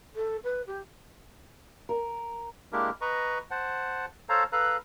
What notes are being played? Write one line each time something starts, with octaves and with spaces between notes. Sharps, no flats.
A4
B4
G4
A#4
G#3 A#3 D4 E4 G4 A#4
B4 D#5 A#5 C#6
C5 F#5 A5
A4 C5 C#5 F5 A5 A#5
A4 B4 F5 A#5 F#6